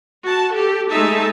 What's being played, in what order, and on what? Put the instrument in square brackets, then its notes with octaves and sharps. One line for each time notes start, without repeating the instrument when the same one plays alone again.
[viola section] F#4 A5
G4 A4
G#3 A3 D#4 G#4 E5 A5